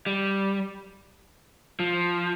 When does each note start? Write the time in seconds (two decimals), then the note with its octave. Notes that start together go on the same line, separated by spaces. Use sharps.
0.06 G3
1.80 F3